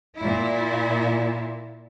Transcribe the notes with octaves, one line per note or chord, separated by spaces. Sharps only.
A#2 E4